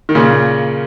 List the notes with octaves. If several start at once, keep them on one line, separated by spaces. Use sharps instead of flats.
D#3
A#2 C#3